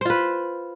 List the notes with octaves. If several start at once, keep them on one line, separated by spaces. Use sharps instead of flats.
F4 B4 C5